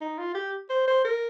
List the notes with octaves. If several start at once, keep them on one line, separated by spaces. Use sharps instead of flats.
D#4
F4
G4
C5
C5
A#4